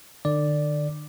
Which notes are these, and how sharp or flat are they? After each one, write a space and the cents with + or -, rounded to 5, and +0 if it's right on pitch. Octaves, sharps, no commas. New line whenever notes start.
D3 +40 D5 +0